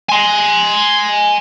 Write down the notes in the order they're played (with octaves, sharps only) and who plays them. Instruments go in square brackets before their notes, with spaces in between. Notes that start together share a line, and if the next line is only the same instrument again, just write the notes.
[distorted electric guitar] G#5 C6